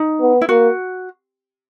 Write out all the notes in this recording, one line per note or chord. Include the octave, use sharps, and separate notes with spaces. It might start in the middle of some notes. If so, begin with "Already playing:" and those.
Already playing: D#4
B3
E4
A#3 F#4